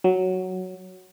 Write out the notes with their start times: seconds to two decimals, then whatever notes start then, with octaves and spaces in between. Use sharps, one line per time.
0.04 F#3